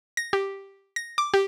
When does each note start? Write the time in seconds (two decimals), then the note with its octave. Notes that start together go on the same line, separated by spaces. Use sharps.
0.17 A#6
0.33 G4
0.96 A#6
1.18 D6
1.34 G4